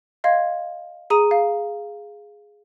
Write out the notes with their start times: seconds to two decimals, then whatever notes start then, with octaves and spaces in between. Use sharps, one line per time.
0.24 D#5 F5 C6 G#6
1.10 G#4 A#5 D#6 D#7
1.31 F5